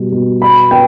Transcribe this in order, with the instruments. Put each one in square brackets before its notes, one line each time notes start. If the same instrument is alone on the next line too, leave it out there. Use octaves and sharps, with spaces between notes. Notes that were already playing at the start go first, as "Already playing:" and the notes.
Already playing: [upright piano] B2 G3
B2
B3 B5
B3 G5